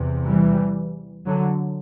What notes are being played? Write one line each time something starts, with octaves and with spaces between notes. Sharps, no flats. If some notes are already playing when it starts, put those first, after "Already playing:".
Already playing: E2 C3
E3 G3
D3 F#3